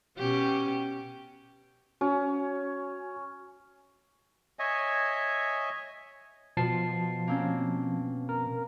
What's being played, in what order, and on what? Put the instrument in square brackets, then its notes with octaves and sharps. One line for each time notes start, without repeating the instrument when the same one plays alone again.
[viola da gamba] B2 C#4 G4
[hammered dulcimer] C#4 [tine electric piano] F#4
[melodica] C#5 D#5 E5 G#5
[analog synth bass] B2 [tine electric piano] F3 A5 C7
[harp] A#3 C4 C#4
[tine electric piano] A#4